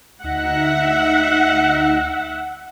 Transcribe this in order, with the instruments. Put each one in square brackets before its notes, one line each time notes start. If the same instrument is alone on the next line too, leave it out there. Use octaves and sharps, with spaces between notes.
[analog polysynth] D2 D#4 A#6 [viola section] E5 F#5